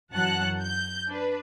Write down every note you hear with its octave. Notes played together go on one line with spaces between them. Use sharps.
F#2 E3 F#3 F#5 A5 F#6
G6
D4 B4